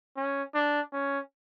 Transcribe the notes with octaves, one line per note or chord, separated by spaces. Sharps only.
C#4
D4
C#4